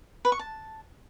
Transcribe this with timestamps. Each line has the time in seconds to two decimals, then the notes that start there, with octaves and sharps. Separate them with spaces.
0.25 B4
0.32 C#6
0.39 A5